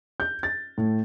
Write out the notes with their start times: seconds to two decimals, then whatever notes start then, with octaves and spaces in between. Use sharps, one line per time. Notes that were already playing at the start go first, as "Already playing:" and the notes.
0.20 G6
0.43 A6
0.78 A2